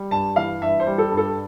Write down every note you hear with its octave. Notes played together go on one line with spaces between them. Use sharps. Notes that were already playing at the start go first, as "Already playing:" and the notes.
Already playing: G3
G2 A5
E3 F5
G2 E5
C5
G3
A4
G2
A4